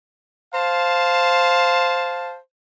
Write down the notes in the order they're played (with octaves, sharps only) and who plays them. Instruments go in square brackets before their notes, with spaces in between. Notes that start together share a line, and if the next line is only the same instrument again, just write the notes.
[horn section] C5 F5 A5